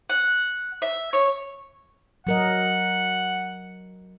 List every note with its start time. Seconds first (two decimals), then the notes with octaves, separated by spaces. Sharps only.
0.10 F#5
0.82 E5
1.13 C#5
2.27 F#3 A#4 D#5 F#5